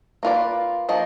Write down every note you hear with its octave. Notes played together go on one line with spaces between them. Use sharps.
A#3 F4 B4 D5
F3 A#3 D#5